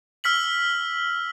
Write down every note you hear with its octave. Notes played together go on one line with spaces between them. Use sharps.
E6 F6 B6 F#7